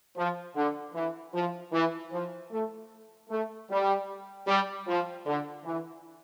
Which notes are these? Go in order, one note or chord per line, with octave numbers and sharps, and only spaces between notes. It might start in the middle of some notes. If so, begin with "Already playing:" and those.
F3
D3
E3
F3
E3
F3
A3
A3
G3
G3
F3
D3
E3